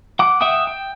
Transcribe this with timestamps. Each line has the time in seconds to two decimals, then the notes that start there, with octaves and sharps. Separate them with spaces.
0.19 F#5 D6
0.41 E5 F#5 G5 D#6
0.67 G5